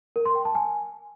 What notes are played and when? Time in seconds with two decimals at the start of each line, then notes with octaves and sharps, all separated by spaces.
0.16 A#4
0.26 C6
0.35 G5
0.45 A5
0.55 G#5